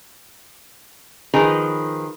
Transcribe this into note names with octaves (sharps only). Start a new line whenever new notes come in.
D#3 F3 G#4 B4 A#5